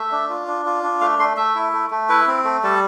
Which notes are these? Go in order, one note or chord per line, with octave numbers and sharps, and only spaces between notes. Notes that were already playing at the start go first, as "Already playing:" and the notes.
Already playing: A3 E5
D4
F4
D4
F4
D4
A3 F5
A3 C6
A3 E5
E4
A3
A3
E4 B4
C4
A3
G3 A4